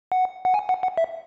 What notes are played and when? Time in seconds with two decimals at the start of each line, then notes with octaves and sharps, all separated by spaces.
0.12 F#5
0.45 F#5
0.54 G#5
0.69 F#5
0.83 F#5
0.98 E5